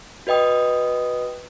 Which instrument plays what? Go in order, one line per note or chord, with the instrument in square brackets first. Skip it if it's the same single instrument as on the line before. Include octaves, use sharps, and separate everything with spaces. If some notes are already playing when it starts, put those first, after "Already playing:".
[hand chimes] F#4 B4 D#5 G5 D#6